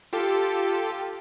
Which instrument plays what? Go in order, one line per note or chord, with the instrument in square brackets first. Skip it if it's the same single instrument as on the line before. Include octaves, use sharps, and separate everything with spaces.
[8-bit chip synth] F4 G4 A4